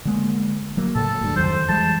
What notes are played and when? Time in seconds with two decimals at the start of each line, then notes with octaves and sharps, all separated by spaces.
0.05 D3 G#3 A#3
0.77 F#3 A#3
0.95 A2 C#3 A4
1.21 D2 G2
1.36 F2 D#3 F#3 C5
1.69 E3 G3 G#3 A5